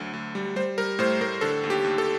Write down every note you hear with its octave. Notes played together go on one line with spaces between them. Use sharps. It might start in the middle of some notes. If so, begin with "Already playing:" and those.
Already playing: D2 D3 F#3
D2
G3
G3 C5
G3 A#4
A2 C5
A2 A#4
D3 A4
D#2
G4
D#2
A4